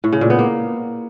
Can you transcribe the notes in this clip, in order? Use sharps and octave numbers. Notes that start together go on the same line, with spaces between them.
A2
C#3
A#2
B3
A#3